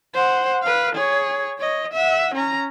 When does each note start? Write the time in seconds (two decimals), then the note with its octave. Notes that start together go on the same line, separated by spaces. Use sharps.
0.13 C5 F#5
0.62 B4 F5
0.95 G#4 C#5
1.59 C#5 D#5
1.93 E5 F#5
2.35 C#4 A#5